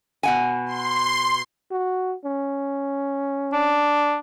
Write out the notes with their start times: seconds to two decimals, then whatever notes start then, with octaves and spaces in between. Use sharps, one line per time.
0.23 B2 F#5 G#5
0.66 C6
1.71 F#4
2.25 C#4
3.53 D4